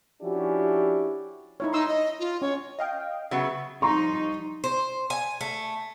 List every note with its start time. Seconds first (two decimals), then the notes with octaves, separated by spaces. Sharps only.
0.22 F3 C#4 D4 E4 F#4 G4
1.60 D#4 E4 C#5
1.73 D#4 C6 E6
1.88 D#5
2.20 F4
2.42 C#4 C#5
2.79 D#5 F5 G5
3.31 C#3 F#3 B3 E5 C#6
3.82 F3 G3 D#4 A#5 C6 C#6
4.64 C5
5.10 G#5
5.41 A3